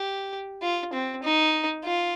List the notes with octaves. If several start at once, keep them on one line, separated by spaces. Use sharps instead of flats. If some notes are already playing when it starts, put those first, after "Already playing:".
Already playing: G4
F4
C4
D#4
F4